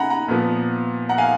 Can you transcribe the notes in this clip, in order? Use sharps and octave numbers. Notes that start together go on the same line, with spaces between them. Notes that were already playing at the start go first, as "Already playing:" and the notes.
Already playing: C#3 F#5 G#5 A#5 B5
F#5 A#5
A#2 F3 B3
F#5 A#5
F5 G#5